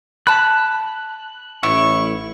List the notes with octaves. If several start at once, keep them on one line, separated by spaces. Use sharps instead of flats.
A5 B5 F#6
A1 E4 C#6